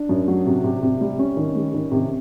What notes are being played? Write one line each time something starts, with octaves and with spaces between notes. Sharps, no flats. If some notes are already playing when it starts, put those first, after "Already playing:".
Already playing: D4
F#2
F#3
C3
C3
C3
G3
G3 C#4
D#3
G3
D#3
C3